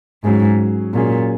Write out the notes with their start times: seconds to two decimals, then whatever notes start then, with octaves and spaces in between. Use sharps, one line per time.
0.24 G#2 F#3 C#4 G#4
0.93 A#2 F#3 C#4 G#4